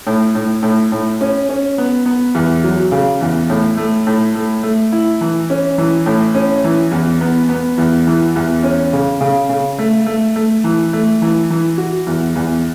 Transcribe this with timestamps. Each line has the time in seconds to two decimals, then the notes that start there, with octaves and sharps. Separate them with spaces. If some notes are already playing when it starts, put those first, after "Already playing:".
0.07 A2
0.35 A2
0.63 A2
0.92 A2
1.21 C#4
1.49 C#4
1.78 B3
2.06 B3
2.35 E2
2.64 F#3
2.92 C#3
3.21 E2
3.50 A2
3.77 A3
4.07 A2
4.35 A3
4.63 A3
4.92 E4
5.21 E3
5.50 C#4
5.78 E3
6.06 A2
6.35 C#4
6.64 E3
6.92 E2
7.21 B3
7.49 B3
7.78 E2
8.07 E3
8.36 E2
8.63 C#4
8.93 C#3
9.21 C#3
9.49 C#3
9.79 A3
10.06 A3
10.36 A3
10.64 E3
10.93 A3
11.22 E3
11.50 E3
11.78 F#4
12.07 E2
12.36 E2